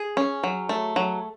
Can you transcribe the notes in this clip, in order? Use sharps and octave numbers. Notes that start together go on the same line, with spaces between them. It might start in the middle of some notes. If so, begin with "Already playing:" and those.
Already playing: G#4
C#4
F#3
A3
F#3